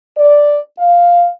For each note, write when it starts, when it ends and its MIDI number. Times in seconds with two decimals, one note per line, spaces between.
0.18 0.59 74
0.79 1.27 77